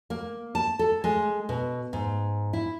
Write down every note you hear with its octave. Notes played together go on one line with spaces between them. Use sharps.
A#3
A5
A4
G#3
B2
G#2
E4